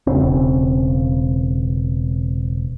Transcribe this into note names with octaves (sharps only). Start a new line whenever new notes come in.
E1 C#3 C4